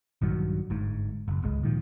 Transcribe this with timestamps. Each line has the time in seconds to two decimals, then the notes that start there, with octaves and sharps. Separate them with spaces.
0.22 A#1 G2 D#3 F#3
0.70 G1 G#2
1.28 F#1
1.42 G#1 C#2 G#2 G#3
1.63 A#2 D#3 F3